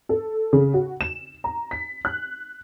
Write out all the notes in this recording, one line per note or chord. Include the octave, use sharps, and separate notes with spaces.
A4
C#3
F#4
E7
A#5
B6
F#6